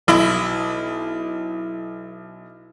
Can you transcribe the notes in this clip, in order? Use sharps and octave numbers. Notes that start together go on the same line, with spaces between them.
B1 E4